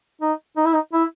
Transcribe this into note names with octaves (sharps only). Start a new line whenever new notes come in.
D#4
D#4
E4
D#4
E4